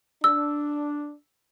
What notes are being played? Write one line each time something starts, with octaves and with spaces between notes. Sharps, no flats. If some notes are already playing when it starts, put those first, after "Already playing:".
D4 E6